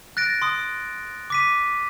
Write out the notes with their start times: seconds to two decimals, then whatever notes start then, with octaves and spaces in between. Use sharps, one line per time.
0.17 F#6 A6 A#6 D7
0.42 C6 D#6
1.30 D6 B6 D#7